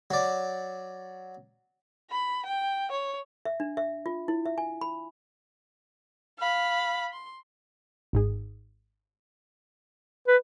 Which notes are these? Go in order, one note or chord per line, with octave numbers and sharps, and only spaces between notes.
F#3 D5
B5
G5
C#5
E5
D4
E5
F4
E4
E5
G#5
B5
F5 B5
C6
G#1 G#2 G#4
B4